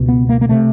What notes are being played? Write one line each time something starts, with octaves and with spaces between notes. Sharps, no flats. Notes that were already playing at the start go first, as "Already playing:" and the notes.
Already playing: C#2 B2
B3
A#3
A#3
C3 A3